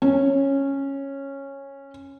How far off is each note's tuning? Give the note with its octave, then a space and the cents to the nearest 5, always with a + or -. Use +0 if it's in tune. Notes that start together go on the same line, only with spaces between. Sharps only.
C#4 -10